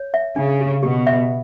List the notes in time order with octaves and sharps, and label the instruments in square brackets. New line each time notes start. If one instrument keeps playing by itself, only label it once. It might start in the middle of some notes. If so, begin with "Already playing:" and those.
Already playing: [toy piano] C#5
E5
[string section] C#3 [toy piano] D4
[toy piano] G4
[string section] B2 [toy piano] G4
[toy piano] E5